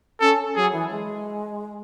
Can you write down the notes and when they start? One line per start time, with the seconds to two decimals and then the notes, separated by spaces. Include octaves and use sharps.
0.21 C#4 A4
0.56 F#3 G#4
0.73 E3
0.90 G#3